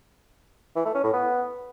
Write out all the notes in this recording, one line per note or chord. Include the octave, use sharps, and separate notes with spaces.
E3
A3
C#4
A2
B3